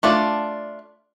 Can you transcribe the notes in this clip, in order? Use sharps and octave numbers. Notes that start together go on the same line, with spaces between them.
A3 D4 F4 D5